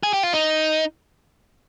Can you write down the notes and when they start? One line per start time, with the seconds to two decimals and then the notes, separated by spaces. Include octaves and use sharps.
0.03 G#4
0.13 G4
0.23 F4
0.33 D#4